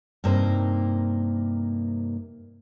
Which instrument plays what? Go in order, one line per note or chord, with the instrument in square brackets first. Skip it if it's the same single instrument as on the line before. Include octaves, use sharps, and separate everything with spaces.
[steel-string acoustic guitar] G2 C3 A#3 D#4 A#4 C5